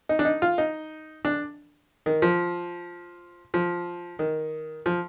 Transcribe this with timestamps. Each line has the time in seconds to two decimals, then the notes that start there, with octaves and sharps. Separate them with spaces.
0.09 D#4
0.19 D4
0.25 D#4
0.42 F4
0.58 D#4
1.25 D4
2.06 D#3
2.22 F3
3.54 F3
4.19 D#3
4.86 F3